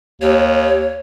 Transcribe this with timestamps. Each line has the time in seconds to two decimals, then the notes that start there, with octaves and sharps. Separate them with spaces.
0.22 D#2 C#5